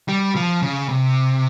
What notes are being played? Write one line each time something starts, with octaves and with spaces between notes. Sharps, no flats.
G3
F3
C#3
C3